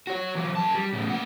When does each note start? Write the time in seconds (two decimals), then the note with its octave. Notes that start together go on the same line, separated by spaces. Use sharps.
0.07 F#4 C#5
0.35 E3 F#3
0.55 F#2 A5
0.75 G3
0.93 A2 C#3
1.10 A#3 F#5